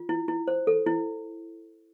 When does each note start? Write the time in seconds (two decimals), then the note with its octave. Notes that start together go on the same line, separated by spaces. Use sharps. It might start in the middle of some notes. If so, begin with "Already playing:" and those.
Already playing: F4
0.09 E4
0.28 E4
0.48 C5
0.67 A4
0.87 E4